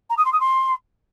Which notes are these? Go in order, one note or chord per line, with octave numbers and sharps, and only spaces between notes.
A#5
D#6
C6
D#6
C6